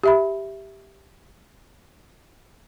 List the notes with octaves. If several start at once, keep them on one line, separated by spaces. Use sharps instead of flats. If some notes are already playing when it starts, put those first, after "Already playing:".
G4 E5 B5